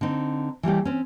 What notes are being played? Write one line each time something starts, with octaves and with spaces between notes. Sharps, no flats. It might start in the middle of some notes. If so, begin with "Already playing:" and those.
D3 C4 D#4
E3 G3 A3 G4
C4 C#4